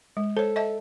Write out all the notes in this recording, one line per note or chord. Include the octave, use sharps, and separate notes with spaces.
G#3
A4 C5 C#5
D#5 E5 A5